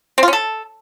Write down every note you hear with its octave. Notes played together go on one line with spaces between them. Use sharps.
C4
F4
C#4
A4